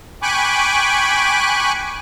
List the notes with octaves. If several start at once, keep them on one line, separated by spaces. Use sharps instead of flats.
G5 G#5 B5 C#6 D6 F#6